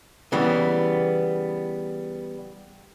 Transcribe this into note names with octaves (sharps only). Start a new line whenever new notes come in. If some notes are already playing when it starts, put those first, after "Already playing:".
C#3 E3 G3 B3